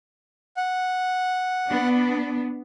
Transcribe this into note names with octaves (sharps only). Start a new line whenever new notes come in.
F#5
B3 D4